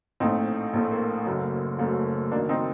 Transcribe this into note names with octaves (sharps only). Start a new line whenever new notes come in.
A#1 A2 A3 C4 D#4
A#1 A2 A3
A#3
F#1 F#2 F#3 A3
F#1 F#2 F#3 A3
F#1 F#2 D#3 A#3 D4
C4 D#4